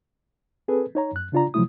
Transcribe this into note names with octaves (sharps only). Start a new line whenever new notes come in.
C4 G#4 A4 B4
D#4 C#5 A#5
F#2 F#6
C#3 D4 F4 D5 A#5
C3 F3 F#3 A3 E4 D#6